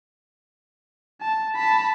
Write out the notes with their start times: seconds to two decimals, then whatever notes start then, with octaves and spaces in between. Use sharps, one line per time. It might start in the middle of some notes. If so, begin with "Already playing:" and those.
1.21 A5
1.56 A5 B5